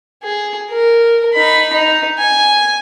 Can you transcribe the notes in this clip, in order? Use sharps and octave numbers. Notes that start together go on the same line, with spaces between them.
G#4
A#4
D#4 B5
D#4
G#5